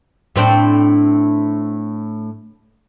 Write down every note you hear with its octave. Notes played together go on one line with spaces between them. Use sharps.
A2 C4 D4